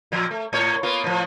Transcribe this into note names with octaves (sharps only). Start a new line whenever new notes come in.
A#2 F3
A3
A2 C#5
A#3 B3 F4
A2 F3